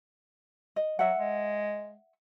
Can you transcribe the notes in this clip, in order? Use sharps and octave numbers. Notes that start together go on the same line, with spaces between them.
D#5
F#3 E5 F#5
G#3